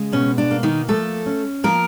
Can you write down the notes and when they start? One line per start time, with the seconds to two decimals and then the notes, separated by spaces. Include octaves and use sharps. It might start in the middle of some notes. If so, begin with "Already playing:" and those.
Already playing: C#3 G#3
0.12 B2 C#4
0.38 D4
0.51 A#3
0.63 D#3 D#4
0.89 F3 A3 A4
1.26 C#4
1.64 F3 A#3 A#4